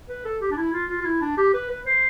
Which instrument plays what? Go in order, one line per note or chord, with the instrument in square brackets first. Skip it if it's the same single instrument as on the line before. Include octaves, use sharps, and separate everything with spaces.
[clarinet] B4
A4
G4
D4
E4
F4
F4
F4
E4
D4
G4
B4
B4
C5